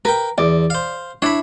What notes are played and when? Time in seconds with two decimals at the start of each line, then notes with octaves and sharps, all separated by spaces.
0.05 A#4 B4 G5
0.38 E2 D5
0.70 C5 F5
1.22 D4 E4 C#5 B5